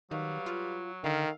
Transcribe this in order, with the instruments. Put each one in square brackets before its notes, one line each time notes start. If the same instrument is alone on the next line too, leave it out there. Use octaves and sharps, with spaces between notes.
[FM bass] D#3 [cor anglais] F#3 [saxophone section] G3 B4 F5
[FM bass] F4
[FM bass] D3 [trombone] D#3 [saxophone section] A4 E5 F5